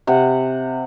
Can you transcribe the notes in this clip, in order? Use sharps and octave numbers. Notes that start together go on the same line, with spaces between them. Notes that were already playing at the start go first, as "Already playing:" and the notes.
C3 F#5